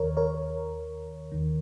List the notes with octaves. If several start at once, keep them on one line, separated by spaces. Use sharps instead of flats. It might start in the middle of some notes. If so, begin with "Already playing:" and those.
Already playing: D#2 D#3 A#4 C#5
A#4 C#5
D#2 D#3